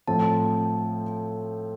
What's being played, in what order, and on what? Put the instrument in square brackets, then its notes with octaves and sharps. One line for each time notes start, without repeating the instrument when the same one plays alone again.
[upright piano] A2 F3 C4 [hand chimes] A5